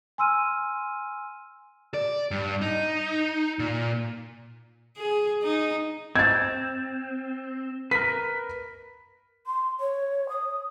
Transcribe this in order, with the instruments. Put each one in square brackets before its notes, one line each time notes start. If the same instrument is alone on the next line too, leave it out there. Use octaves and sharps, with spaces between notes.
[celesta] G#5 C6 E6 F6 D#7
[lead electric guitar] D5
G2
D#4
A#2
[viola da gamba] G#4
D#4
[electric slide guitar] C4 [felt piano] G#6 A6
[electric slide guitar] A#4 B4 [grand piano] B6
[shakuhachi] C6
C#5
D#6